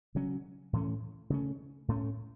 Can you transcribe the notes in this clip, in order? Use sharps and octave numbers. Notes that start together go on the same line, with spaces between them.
C#3 F#3 C#4
A2 E3 A3 C#4
C#3 A3 C#4
A2 A3 C#4